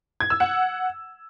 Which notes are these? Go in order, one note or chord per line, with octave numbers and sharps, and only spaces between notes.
G#6
E6
F#5